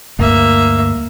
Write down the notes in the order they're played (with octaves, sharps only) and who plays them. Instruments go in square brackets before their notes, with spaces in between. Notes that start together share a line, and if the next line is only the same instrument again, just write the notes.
[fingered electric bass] D2 G2 A3 [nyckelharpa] A#3 E5